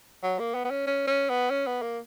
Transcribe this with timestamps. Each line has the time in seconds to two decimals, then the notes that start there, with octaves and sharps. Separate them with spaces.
0.23 F#3
0.39 A#3
0.55 B3
0.65 B3
0.71 C#4
0.87 C#4
1.08 C#4
1.30 B3
1.51 C#4
1.67 B3
1.82 A#3